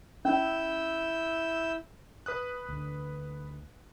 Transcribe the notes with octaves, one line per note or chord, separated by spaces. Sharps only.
C#4 E4 E6 G6
B4 D#6 F#6
D2 D3